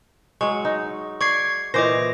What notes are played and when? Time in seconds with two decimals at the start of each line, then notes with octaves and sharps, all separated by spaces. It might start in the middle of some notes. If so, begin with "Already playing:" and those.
0.41 F#3 G#3 C#6
0.65 D#4
1.21 D5 C#6 G#6 C7
1.74 A#2 E3 C5 D#5 D6 A#6